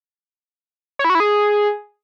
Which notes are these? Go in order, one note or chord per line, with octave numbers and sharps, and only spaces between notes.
C#5
E4
F#4
E4
G#4